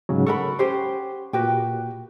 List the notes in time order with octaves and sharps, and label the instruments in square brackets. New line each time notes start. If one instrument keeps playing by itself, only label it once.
[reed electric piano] G#2 C#3 F#3
[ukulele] A4 A#4 B5 [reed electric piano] F#5 C#6
[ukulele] C#4 G4 C5
[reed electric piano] A#2 G4 [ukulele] F#4 B4 G5